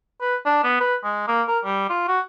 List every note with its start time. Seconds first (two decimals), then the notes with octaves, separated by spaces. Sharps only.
0.21 B4
0.46 D4
0.64 B3
0.80 B4
1.04 G#3
1.28 A#3
1.48 A#4
1.64 G3
1.90 F4
2.08 F#4